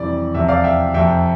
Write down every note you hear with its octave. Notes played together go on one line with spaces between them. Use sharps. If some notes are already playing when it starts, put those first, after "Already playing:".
Already playing: F2 C3 E3 G3 D5
E2 C3 F3 E5
D5 F5
E5 G5
F2 C3 F3 E5 G5